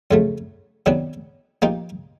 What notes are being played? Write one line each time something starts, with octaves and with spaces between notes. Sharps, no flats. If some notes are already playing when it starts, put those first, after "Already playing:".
F2 C#3 F#3 A3
C3 D#3 F#3 B3 D4
F3 A#3 D#4 G4